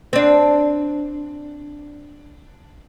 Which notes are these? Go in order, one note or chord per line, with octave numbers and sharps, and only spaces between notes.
C4 D4